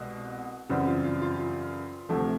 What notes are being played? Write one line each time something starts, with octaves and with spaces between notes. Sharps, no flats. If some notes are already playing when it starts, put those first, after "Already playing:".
Already playing: C2 B2 G#3
F#2 C#3 E3 G3 C4 F#4
F4
F4
F4
F4
D2 C3 F3 A3